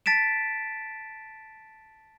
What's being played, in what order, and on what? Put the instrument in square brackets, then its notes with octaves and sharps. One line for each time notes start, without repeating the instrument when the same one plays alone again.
[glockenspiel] A5 A6 B6 D7 E7